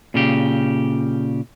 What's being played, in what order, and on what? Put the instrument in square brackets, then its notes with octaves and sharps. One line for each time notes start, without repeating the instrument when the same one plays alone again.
[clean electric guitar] A#2 C#3 G4